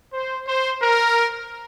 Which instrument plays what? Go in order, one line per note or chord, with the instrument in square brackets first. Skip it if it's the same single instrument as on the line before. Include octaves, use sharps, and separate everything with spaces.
[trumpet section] C5
C5
A#4